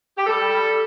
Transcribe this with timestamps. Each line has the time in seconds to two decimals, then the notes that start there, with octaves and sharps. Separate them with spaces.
0.17 G4
0.26 G3 A4
0.49 G3